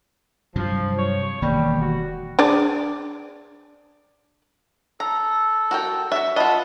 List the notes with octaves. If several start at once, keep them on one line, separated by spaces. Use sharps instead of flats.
G2 C3 F3 F#3
C#5
E1 D#3 G3 A#3
F#4
D4 G#4 D5
A4 A#5
F#4 A#4 G5
F#4 E5
F4 B4 D#5 F#5 A5